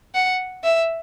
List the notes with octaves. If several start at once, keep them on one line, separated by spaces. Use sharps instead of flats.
F#5
E5